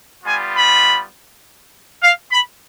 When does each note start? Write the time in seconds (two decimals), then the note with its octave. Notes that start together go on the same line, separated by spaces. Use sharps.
0.24 G3 B3 F4 G#5
0.54 B5
2.02 F5
2.31 B5